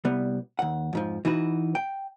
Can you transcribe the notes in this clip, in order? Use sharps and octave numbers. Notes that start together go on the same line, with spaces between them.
C2 G3 B3
D#2 F#5
F2 G#2 F3
E3 D#4 F#4 B4
G5